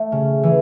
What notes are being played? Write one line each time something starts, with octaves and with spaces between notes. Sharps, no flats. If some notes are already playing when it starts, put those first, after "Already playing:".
Already playing: A3
C#3
E3